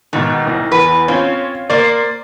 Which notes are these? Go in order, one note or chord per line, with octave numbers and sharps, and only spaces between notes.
G#2 B2 D#3
C2
E2 B4
C4 C#4 F4 C#5
A#3 C5 D5